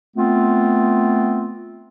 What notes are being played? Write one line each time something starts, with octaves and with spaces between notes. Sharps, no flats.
A3 B3 C4 F4